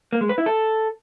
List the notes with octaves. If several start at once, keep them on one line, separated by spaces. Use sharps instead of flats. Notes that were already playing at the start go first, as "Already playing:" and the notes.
A#3
G#3
B4
E4
A4